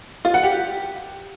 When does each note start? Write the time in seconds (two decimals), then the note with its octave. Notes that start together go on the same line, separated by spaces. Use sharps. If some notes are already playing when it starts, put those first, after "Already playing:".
0.25 F4
0.34 F#5
0.43 G4